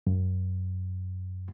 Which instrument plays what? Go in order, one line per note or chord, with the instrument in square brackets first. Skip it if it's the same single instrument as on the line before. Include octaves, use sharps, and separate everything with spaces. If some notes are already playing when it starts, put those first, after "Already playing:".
[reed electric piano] F#2